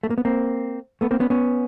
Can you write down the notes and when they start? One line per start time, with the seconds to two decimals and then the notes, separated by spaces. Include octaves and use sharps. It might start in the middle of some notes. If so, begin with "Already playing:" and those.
0.03 A3
0.10 A#3
0.18 B3
0.25 A#3 C4
1.01 A3 B3
1.11 A#3 C4
1.20 B3 C#4
1.30 B3 C#4